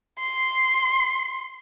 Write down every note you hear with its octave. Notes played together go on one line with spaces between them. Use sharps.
C6